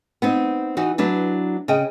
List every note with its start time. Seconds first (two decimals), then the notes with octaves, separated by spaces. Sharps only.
0.22 B3 C4 D#4
0.77 E3 D#4 F#4
0.98 F#3 D4 E4 B4
1.68 C#3 G#4 D#5 G5